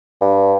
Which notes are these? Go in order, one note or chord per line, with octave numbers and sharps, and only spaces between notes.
G2